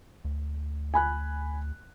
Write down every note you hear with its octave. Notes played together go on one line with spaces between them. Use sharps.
D2
G#5 B5 F#6